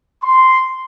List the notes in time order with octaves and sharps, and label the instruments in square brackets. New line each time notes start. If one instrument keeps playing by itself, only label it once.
[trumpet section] C6